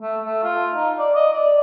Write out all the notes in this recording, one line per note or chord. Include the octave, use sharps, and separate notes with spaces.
A3
A3
F4
D#4
D5
D#5
D5